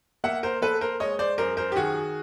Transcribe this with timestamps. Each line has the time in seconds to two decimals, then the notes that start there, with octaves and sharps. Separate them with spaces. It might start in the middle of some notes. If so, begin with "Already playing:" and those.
0.24 A#3 E5 F#5
0.43 A#4 C5
0.62 A#3 A4 B4
0.81 A#4 C5
1.00 G#3 C#5 D#5
1.19 C5 D5
1.38 F#2 A#4 C5
1.57 A#4 C5
1.72 G4
1.76 D#3 F#4 G#4